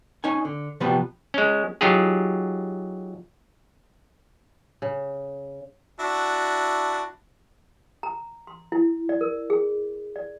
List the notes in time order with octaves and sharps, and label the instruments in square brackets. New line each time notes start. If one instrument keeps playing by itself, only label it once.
[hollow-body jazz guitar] C#4 D#4 G#5
D3
C3 F3 G3 B3 F#4 B4
[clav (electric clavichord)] G#3 C#4
F#3 D#4 F4 G4 G#4
[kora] C#3
[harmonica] D4 E4 F#4
[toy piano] A#5
C6
E4
D5
A#4
G#4
D5